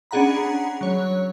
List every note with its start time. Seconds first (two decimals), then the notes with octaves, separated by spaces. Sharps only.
0.11 C#4 D4 G#4 F#5 A#5 B5
0.81 F#3 C#5